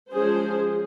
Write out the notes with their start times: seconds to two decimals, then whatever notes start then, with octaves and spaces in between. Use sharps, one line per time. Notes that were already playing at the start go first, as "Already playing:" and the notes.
0.11 F3 G#3 C#4 G#4 C5